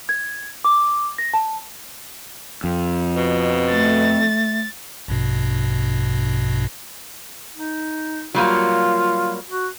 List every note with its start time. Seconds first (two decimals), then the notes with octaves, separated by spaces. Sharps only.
0.09 G#6
0.65 D6
1.18 A#6
1.34 A5
2.64 F2
3.16 B2
3.70 A3 A6
5.08 A#1 G2 B2
7.56 D#4
8.35 F#3 G3 A#3 F4
9.50 F#4